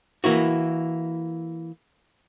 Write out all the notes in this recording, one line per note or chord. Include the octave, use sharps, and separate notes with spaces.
E3 A#3 E4 F#4